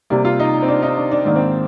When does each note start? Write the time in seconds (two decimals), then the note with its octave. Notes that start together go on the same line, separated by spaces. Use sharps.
0.10 C3 G3 A#3 D5
0.25 F4
0.40 D#4
0.62 C4
0.68 D4
0.83 D#4
0.97 D4
1.11 D4
1.25 G#2 D#3 A#3 D4
1.36 C4